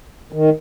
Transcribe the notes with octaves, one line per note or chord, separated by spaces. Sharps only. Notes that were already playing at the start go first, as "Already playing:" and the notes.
D#3